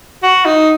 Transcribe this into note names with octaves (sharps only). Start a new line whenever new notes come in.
F#4
D#4